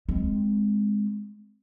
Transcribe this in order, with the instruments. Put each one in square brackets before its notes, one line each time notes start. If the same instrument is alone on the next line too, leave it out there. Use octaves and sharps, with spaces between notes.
[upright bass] G#3 C4